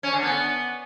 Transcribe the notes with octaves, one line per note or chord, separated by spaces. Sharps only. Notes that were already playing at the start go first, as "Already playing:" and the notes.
C#4
D3
B3